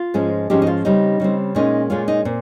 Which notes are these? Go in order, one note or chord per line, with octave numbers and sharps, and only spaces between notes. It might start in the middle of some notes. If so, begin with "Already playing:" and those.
Already playing: F4
G#2 F3 G#3 C#4
G#2 F3 G#3 C#4 D#4 G4
D#4
F4
C#3 G3 C4 D#4
C#3 G3 C4
A#2 G#3 C#4 D#4
A#2 G#3 C#4 F4
D#4
A#2 C4